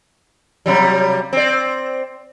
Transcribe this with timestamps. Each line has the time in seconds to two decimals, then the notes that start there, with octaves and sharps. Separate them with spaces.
0.66 C3 F#3 G3
1.33 C4 D5